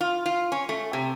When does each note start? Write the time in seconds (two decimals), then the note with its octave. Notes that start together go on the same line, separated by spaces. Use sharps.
0.01 F4
0.26 F4
0.52 C#4
0.69 A3
0.93 C3